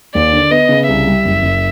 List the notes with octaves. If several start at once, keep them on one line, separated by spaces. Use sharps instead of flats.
D#2 D5
D3
B3 D#5
C#3
C2 E5
G3
F#1
F#1